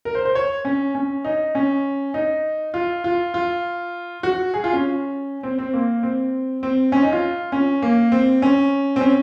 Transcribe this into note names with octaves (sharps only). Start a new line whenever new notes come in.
A#4
C5
C5
C#5
C#4
C#4
D#4
C#4
D#4
F4
F4
F4
F#4
G#4
F4
C#4
C4
C4
A#3
C4
C4
C#4
D#4
F4
C#4
A#3
C4
C#4
C4
C#4